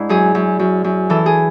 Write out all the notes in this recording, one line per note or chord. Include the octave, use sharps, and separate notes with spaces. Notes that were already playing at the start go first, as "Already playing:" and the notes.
Already playing: G#2 D4 E4
F#2 G#4
F#2
F#2
F#2
E3 A4
G#4